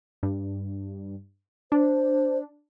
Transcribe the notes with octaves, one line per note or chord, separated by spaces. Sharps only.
G2
D4 C5